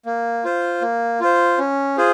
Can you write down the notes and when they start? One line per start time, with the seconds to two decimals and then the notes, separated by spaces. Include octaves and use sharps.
0.06 A#3
0.45 F4 C5
0.82 A#3
1.20 F4 C5
1.58 C#4
1.97 F4 G#4 C5